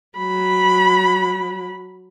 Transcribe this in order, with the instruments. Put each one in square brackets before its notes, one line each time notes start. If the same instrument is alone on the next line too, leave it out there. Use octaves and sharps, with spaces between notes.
[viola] F#3 B5